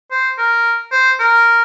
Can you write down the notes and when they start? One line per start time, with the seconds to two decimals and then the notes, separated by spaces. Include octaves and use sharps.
0.11 C5
0.38 A#4
0.92 C5
1.20 A#4